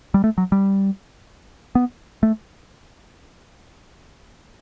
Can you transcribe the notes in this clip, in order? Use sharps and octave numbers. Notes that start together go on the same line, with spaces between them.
G3
A3
F#3
G3
B3
A3